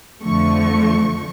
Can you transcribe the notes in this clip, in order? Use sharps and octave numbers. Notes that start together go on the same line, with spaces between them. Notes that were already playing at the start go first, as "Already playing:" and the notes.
F2 D3 F3 A3 C#6